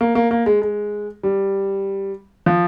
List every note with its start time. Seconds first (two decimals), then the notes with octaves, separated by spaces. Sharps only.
0.01 A#3
0.15 A#3
0.31 A#3
0.46 G#3
0.62 G#3
1.23 G3
2.46 F3